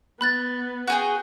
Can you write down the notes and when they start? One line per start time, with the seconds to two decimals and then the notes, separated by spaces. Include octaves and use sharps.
0.21 B3 B5 F#6 A6
0.87 F#4 G#4 G5